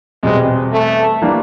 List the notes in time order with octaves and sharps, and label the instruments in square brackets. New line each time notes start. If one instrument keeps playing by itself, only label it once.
[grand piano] E2 B2 G3 C4 [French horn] G#3
[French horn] A3
[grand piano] E3 G3 A#3 D4